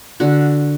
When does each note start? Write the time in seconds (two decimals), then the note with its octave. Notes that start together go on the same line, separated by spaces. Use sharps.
0.20 D3 F#4